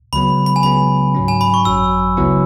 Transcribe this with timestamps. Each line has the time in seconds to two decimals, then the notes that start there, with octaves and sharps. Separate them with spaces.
0.13 C#2 C#3 F#3 B3 B5
0.46 B5
0.56 G#5
0.63 C#2 C#3 F#3 B3 B5
1.15 G#2 F#3 C#4
1.28 G#5
1.41 B5
1.54 C#6
1.65 G#1 F#2 F#3 E6
2.17 C#2 C#3 F#3 B3 E4